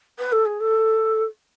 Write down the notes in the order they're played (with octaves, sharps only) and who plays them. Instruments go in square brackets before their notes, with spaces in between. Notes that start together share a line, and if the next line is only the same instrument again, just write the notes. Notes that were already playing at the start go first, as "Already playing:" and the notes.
[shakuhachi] B4
A4
G#4
A4